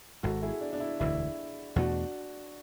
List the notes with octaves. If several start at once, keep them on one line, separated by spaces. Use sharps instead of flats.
G#1 G#2 G#3 F#4 A4
E4 G#4
D4
D4
E4
E1 D2 D3 E4
E2 B2 A3 D4 F#4